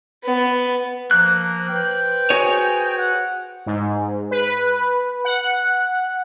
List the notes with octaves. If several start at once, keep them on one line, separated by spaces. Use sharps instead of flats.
B3
F3 A#3 F#6
B4 C5 G5
F#4 G#4 C#5
F#5
G#2
B4
F#5